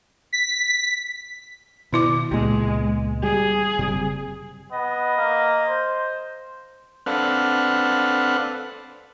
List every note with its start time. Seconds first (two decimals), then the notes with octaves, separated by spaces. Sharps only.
0.33 B6
1.93 B2 D#3 E4 D6
2.31 C#2 A#2 G#3 B3
3.23 G3 G#4
3.79 F#1 C3 G3
4.72 B3 D#5
5.17 A#3
5.68 C5
7.06 C4 D4 A4 B4 F5 F#5